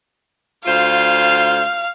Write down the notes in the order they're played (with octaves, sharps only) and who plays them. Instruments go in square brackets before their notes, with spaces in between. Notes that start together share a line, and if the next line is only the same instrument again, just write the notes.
[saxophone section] D2 F4 C5 [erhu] F5